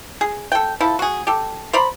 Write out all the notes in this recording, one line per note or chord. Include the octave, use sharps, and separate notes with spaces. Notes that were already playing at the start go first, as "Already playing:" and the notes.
G#4
A4 G5
F3 E4 A4
F#4 G#4
G4 A4
C5 D5 A#5 B5